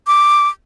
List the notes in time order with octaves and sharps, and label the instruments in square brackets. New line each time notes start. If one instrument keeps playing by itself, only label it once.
[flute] D6